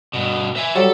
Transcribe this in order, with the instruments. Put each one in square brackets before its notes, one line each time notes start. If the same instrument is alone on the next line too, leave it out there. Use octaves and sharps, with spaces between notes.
[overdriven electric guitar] G2 B2
E5 G#5
[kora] F#3 G3 [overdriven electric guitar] A4